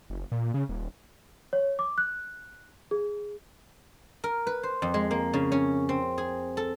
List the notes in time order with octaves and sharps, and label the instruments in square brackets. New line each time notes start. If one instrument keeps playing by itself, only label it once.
[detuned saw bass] F#1
A#2
C#3
D#1
[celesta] C#5
D6
F#6
G#4
[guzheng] A#4
B4
C5
F2
G#3
A#3
C#3
C#4
C4
G#4
A4